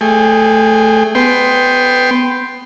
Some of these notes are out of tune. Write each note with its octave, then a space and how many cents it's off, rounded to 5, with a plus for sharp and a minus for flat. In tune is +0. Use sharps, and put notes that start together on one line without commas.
A3 +0 G#4 +0 G5 +30
B3 +15 G5 +0 C6 +0